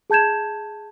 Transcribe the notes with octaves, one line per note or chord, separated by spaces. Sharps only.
G#4 A5 G6 G#6 E7